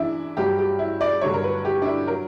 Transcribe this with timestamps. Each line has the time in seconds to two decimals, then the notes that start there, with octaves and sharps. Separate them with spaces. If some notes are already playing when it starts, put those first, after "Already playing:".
Already playing: F#2 E3 D4 E4
0.37 G2 F#3 G4
0.58 G4
0.79 E4
1.01 D5
1.21 G2 D3 F#3 C#5
1.34 A#4
1.44 B4
1.65 G4
1.82 D4
1.85 E4
2.07 F#3 A#4